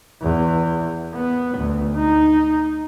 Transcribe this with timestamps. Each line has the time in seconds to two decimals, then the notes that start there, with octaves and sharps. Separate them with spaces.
0.22 E2
1.14 B3
1.57 D2
1.97 D#4